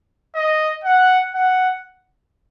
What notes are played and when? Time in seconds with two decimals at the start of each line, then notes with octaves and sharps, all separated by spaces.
0.35 D#5
0.84 F#5
1.34 F#5